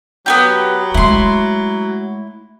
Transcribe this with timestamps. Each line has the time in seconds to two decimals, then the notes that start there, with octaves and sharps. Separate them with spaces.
0.26 F#3 B3 C4 G4
0.94 G#3 A3 E4 C6